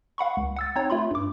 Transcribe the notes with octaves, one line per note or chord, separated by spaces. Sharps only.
F5 F#5 B5 C#6
C#2
F#5 E6 A6
C4 D#4 C#5
A3 F4 B5 C6
G2 D6